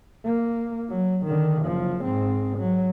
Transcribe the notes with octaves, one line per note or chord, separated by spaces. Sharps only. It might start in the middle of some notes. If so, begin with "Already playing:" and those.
A#3
F#3
D3 D#3
F#1 F3
G#2 C4
F#3